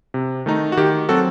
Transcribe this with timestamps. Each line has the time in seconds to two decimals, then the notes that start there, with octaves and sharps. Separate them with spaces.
0.14 C3
0.46 D#3 A3 D#4
0.72 F#4
0.77 D#3 G4
1.09 F#3 C4 F#4 A4